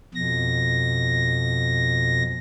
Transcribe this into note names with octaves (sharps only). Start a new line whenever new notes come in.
F2 B2 A#6